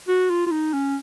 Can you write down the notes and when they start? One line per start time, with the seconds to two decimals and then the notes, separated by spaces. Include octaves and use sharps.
0.08 F#4
0.30 F4
0.46 F4
0.51 D#4
0.74 C#4